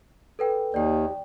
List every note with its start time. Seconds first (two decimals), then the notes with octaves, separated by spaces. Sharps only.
0.39 A4 B4 G5
0.74 D#2 D5 G5